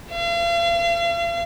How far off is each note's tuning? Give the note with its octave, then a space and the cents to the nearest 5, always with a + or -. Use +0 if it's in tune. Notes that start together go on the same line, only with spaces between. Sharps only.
F5 -40